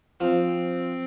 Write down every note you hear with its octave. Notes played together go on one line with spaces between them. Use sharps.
F3 C4